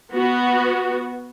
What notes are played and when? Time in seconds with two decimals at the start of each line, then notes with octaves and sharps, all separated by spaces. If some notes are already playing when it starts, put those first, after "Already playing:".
0.12 B3 F#4